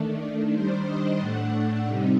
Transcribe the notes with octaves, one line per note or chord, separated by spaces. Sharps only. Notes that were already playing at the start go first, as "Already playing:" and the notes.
Already playing: D#3 A3 D4
D#3 G3 D4 C5
D#5
A2 A3 D4 F#5
C3 G3 C4 D#4